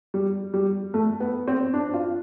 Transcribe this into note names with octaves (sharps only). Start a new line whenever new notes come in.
G3
G3
A3
B3
C4
D4
F4